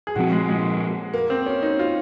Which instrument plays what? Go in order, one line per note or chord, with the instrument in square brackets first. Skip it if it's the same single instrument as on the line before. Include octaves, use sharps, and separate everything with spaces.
[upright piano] G#4
[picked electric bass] A#2 F3 C4 [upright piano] F#4
[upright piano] G#3
G#3
A#3
C4
C#4
D#4
F4